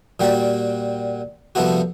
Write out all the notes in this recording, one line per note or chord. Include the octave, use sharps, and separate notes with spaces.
A#2 G3 F#4 G5
C2 F3 A3 B3 F#4